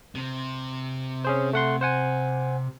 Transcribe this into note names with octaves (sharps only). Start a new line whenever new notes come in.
C3
C#4 G#4 C5
A3 F#5 C6
C5 F#5 G#5